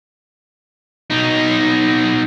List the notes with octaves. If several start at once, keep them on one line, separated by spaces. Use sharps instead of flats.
B2 D#4